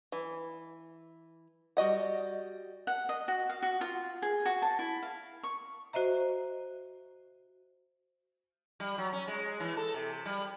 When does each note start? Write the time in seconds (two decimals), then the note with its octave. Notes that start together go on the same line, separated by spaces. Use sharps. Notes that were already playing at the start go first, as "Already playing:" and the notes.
0.12 E3
1.77 G3 F#4 D#5 F#5
2.87 F#5
3.09 D#5
3.28 F#4
3.49 F5
3.62 F#4
3.81 F4
4.22 G#4
4.45 F#4
4.62 A5
4.79 E4
5.03 F5
5.43 C#6
5.93 F#4 C5 D#5 E5 A#5
8.80 G3
8.98 F#3
9.13 C#4
9.27 G#3
9.60 E3
9.77 A4
9.94 C3
10.25 G3